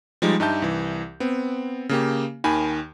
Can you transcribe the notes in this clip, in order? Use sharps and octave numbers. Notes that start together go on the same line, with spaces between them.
F3 G3 G#3 D#4
G2 D#4 G4 E5 A5 G6
C2 E3
B3 C4
C#3 A#3 G4
D#2 D#3 G#5 B5